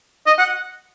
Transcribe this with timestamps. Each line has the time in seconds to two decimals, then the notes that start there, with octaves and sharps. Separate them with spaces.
0.27 D#5
0.39 F#5